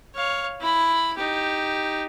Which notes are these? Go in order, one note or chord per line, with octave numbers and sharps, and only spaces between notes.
C#5 F5
E4 B5
D#4 G4